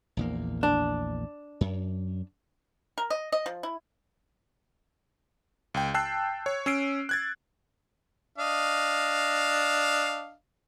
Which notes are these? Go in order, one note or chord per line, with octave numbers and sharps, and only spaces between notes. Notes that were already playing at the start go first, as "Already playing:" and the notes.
A#1 E2 A#3
D4
F#2
A#4
D#5
D#5
F3
E4
C#2 G5
G5 A5 E6 F#6 C7
C#5
C#4 E6 C7 D7
F#6 G#6 A6
D4 D#5 F5